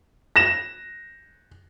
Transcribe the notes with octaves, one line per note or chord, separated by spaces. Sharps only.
A#6 E7